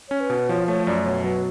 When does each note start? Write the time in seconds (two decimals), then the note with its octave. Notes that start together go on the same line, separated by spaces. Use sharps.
0.09 C#4 C#5
0.20 B4
0.30 B2
0.49 F3 C#5
0.68 A3 C#5
0.86 F#2 D5
1.05 B2 C#5
1.24 F#3 B4